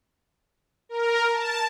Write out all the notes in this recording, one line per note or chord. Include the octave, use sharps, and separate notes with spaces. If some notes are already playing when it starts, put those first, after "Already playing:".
A#4
A5